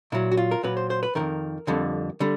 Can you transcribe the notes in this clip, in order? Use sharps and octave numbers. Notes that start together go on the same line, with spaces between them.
A#2 F#3 E4
F#4
F4
A#4
A#2 F#3 B4
C5
C5
B4
F2 C3 D#3 A#4
F2 D3 G3
D3 G3